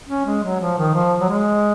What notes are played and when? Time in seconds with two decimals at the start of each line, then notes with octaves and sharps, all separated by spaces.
0.09 C#4
0.26 G#3
0.44 F#3
0.61 F3
0.78 D#3
0.95 F3
1.21 F#3
1.29 G#3